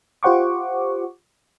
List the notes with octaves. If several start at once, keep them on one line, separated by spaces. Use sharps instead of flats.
F4 G4 C5 F#5 C#6 D6